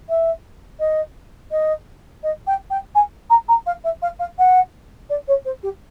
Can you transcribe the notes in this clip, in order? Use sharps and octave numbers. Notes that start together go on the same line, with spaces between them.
E5
D#5
D#5
D#5
G5
G5
G#5
A#5
A#5
F5
E5
F5
F5
F#5
D5
C#5
C5
G4